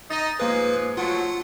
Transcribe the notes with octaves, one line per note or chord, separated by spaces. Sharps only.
D#4 D#5 A6
G#2 F3 A#3 G#4 B4
F3 F#3 A3 F4 F#5